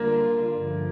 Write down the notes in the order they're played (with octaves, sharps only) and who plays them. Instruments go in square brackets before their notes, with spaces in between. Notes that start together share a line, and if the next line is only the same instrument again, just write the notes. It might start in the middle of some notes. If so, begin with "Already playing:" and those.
Already playing: [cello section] D3 G3 D4 F4 [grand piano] A#3
[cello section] G2 D3 F3 A3